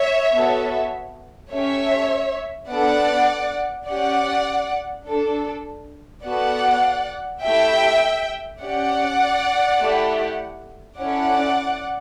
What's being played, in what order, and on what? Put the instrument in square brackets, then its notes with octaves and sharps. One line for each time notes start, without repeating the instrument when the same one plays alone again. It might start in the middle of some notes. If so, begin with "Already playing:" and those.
Already playing: [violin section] C#5 E5
B3 F#4 A4
A3 C#4 G4 C#5 E5
B3 D4 A4 D5 F#5
C#4 G4 D5 F#5
D4 A4
B3 F#4 A4 D5 F#5
A3 E4 G4 E5 G5
C#4 G4 D5 F#5
A3 E4 G4
C#4 E4 A4 D5 F#5